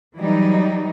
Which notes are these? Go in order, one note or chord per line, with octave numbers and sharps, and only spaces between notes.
E3 F#3 G3 D#4